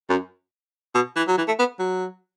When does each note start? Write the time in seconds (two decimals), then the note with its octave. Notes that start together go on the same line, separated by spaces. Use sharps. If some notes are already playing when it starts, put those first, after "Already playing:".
0.10 F#2
0.94 B2
1.16 E3
1.28 F#3
1.38 E3
1.48 A3
1.59 B3
1.79 F#3